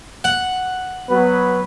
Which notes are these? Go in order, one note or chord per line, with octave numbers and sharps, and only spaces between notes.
F#5
F#3 B3 B4